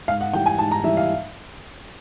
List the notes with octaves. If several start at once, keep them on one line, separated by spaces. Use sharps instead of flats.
G#2 F5
F#5
E3 G3 G5
G#5
G#2 A5
A#5
E3 G3 E5
F5